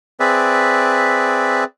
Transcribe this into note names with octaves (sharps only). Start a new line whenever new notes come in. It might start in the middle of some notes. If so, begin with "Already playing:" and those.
C4 G#4 B4 D5 E5